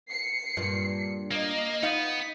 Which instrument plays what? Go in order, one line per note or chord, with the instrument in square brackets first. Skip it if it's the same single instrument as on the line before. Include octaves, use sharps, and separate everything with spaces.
[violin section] C7 C#7
[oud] G2 A#2
[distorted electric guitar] A#3 [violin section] D#5
[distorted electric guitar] B3 [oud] D#4 F4 F5